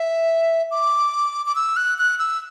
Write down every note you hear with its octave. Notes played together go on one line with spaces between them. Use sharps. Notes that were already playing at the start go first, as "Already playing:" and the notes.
Already playing: E5
D6
D6
E6
F#6
F#6
E6